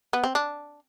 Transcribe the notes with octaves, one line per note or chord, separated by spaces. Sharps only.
B3
C4
D4